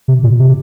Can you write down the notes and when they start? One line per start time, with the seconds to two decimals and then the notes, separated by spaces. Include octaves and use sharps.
0.08 C3
0.24 A#2
0.39 C3